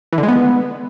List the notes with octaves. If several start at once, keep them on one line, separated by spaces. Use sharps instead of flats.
E3
D3
G#3
B3